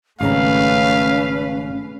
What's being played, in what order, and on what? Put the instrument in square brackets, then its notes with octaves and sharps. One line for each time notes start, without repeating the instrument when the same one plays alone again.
[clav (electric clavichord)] G#1 C#3 A#5 [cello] A3 B4 [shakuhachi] C#4 [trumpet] F5